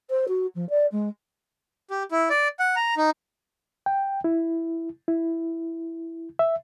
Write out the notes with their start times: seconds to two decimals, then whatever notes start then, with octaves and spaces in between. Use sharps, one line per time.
0.10 C5
0.28 F#4
0.55 F3
0.69 D5
0.92 G#3
1.90 G4
2.11 E4
2.30 D5
2.59 F#5
2.76 A#5
2.97 D#4
3.86 G5
4.24 E4
5.08 E4
6.39 E5